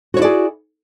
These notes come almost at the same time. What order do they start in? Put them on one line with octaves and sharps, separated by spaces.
F#4 C#5 E4 D5 G#4